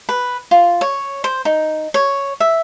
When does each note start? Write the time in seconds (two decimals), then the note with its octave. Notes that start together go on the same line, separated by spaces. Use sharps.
0.09 B4
0.51 F4
0.81 C#5
1.24 C5
1.45 D#4
1.94 C#5
2.40 E5